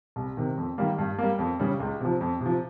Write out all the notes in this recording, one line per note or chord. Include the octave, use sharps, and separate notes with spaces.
C2
C3 D#3
F2
D#3 G3 A#3
G2
G3 A#3
F2
C#3 G3
C#2
C3 F3
F2
C3
F3